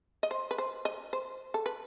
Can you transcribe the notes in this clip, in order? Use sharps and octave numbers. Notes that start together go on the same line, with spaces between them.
D#5
C5
B4
C5
D#5
C5
A4
B4